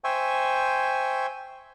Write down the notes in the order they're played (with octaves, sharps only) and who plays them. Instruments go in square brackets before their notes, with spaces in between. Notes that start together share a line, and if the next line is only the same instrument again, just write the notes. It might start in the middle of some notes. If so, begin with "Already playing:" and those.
[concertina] C5 E5 G5 G#5 C#6